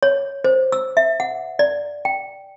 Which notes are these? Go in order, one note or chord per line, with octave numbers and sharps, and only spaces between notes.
C#5
C5
E6
E5
F#5
D5
G5